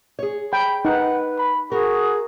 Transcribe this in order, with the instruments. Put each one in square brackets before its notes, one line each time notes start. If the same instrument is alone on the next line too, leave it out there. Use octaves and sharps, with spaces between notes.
[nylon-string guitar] G#4 C#5
[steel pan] G5 [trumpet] B5
[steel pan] D#4 [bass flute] B4 [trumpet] F#5
[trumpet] B5
[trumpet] F#4 [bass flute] G#4 [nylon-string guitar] A#4